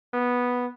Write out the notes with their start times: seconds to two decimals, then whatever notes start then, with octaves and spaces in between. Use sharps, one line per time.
0.13 B3